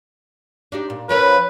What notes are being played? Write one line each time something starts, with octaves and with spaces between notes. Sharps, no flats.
D4 D#4 G4
A#2
F3 C#4 A#4 B4